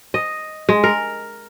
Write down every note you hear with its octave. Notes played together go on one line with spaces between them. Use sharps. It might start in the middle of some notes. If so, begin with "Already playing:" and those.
D#5
G#3
A#4